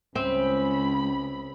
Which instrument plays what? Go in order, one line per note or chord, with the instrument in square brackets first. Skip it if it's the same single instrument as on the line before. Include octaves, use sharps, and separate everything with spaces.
[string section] C#2 B5 [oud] C4 [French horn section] C#4